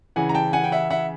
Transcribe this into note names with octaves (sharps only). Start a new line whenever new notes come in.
C#3 E3 F#5 G#5
A#5
G5 A5
F#5 G#5
G5
E5 F#5
E5 F#5